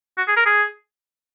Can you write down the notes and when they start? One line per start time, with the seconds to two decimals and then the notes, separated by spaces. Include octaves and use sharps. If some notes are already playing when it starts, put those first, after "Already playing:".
0.18 F#4
0.28 G#4
0.36 A#4
0.46 G#4